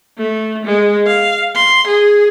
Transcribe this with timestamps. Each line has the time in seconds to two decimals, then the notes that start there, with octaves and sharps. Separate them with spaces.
0.18 A3
0.65 G#3
1.07 F5
1.55 C6
1.87 G#4